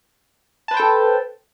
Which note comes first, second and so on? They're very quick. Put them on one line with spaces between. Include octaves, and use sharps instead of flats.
A5 B4 C5 G5 A4